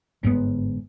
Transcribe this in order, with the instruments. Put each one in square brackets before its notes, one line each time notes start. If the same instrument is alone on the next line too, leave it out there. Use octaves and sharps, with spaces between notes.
[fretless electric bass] G1 G#2 B2 B3